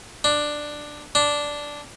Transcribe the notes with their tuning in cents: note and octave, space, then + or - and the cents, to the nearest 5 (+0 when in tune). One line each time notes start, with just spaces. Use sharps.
D4 +10
D4 -5